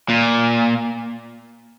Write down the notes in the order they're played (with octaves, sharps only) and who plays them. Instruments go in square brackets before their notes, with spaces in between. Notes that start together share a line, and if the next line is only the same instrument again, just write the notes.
[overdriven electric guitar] A#2